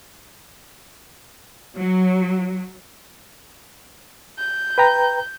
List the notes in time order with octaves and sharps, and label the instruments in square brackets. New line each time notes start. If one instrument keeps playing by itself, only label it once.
[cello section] F#3
[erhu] G6
[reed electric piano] B4 G5 A#5